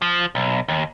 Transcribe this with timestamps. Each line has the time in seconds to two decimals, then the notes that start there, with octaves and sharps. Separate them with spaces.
0.02 F3
0.35 B1
0.68 D#2